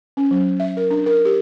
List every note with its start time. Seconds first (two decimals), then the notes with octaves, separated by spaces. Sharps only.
0.17 C#4
0.31 F#3
0.60 E5
0.77 A#4
0.91 D4
1.06 A#4
1.25 G4